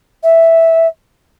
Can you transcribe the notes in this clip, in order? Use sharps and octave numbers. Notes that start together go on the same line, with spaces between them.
E5